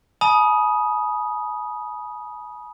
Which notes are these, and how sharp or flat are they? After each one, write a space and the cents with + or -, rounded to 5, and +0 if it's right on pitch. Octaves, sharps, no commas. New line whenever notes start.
G#5 +40 B5 -35 D#6 +0